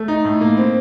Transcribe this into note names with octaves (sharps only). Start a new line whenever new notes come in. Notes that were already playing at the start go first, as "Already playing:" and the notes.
Already playing: A3
D#4
A2
A#3
C4